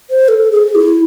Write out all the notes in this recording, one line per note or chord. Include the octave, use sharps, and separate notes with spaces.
C5
A4
G#4
E4